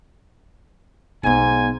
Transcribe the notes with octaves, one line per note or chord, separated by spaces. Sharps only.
B1 G#2 B3 G#5